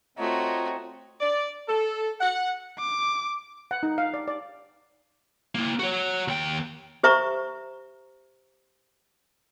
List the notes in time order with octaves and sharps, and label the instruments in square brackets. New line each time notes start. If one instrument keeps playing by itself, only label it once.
[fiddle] A3 F#4 [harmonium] C4 [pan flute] F4 [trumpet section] C#5 D#5 A#5
[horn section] D5
A4
F#5
[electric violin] D6
[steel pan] F#5
D#4
F5
D5
D5
[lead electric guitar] A#3 E4
F#4 C#5
D#2 G5
[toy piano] G4 C5 E5 A#5 C#6